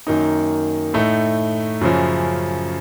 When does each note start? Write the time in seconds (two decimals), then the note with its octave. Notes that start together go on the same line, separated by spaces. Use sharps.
0.07 F#2 D#3 A#3 D#4
0.94 A2 A3 D#4
1.81 F#2 C#3 F3